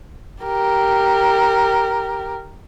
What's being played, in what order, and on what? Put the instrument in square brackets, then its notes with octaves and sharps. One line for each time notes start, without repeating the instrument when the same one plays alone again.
[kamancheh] G4 A#4